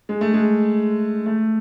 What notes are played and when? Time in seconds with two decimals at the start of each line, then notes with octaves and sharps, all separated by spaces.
0.09 G#3
0.21 A3
0.34 G#3
1.26 A3